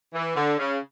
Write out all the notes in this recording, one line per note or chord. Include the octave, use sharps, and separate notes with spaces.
E3
D3
C#3